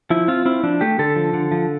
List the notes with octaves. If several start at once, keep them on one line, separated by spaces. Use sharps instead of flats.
F3 E4
C4 F4
C4 E4
F3 D4
A3 G4
D3 A4
F3
D3
F3